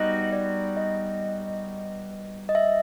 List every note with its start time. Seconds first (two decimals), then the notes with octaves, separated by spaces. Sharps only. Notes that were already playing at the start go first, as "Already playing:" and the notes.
Already playing: G3 B3 D#4 F#4 D#5
0.32 D5
0.77 D#5
2.49 D#5
2.55 E5